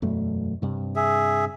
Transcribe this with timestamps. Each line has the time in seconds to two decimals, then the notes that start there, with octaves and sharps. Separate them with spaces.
0.02 E1 F#2 A3
0.62 G2 C3
0.96 G#4 E5